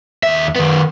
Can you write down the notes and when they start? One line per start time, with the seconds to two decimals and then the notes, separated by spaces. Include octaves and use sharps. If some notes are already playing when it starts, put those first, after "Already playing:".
0.23 D#2 E5
0.56 D#3 B3